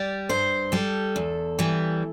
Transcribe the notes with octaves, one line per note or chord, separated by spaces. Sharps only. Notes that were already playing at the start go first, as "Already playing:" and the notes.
Already playing: G3 D5
G2 C5
G3 A4
E2
E3 G3